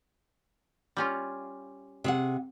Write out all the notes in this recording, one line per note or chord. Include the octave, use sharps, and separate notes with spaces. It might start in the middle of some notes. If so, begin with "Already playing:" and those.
G3 C#4 F4
C3 G#4 F#5